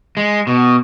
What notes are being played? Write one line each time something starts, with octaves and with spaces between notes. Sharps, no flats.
G#3
B2